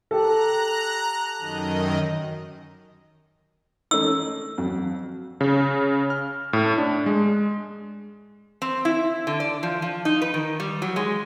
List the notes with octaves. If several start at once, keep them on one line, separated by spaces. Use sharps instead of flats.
G4 A4 A#5 F#6
F#2 D#3 D#5
A3 C#4 D#4 E6
F2 F#3
C#3
F6
A2
D4
G#3
C4
E4
D3
D5
F3
F3
D#4
B4
D#3
G3
F#3
G#3